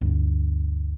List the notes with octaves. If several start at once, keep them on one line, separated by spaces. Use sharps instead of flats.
G1 D2